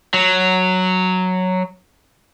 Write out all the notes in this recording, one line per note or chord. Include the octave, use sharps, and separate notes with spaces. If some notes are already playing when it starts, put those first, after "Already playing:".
F#3